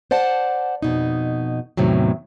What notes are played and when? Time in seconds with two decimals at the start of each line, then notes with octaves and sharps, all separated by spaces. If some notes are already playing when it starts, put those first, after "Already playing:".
0.11 C5 D5 F#5 A5
0.82 F2 B2 D#4
1.77 E2 A2 C3 D#3 F#3